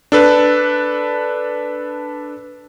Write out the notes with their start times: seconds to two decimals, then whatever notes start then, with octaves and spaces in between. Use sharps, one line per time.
0.12 D4 A4 B4